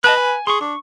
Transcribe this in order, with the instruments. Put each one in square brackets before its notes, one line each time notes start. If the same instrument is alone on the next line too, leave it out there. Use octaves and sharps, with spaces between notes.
[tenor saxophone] B4 [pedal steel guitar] D#5 A5 F#6
[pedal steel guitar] G#5
[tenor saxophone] G#4 [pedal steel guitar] C6 C#6
[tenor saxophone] D4 [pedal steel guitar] C#6